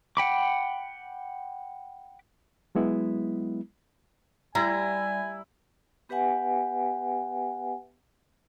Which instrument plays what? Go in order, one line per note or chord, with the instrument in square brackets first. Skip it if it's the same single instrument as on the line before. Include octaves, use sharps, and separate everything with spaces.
[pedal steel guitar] F#5 G5 B5 D6
[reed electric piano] F#3 G#3 B3 E4
[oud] G3 [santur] E4 [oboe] G#5 [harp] A#5
[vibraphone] B3 G4 B4 E5 F#5 G#5